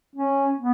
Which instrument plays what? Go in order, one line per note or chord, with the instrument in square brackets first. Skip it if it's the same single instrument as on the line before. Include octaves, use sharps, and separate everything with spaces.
[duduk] C#4
B3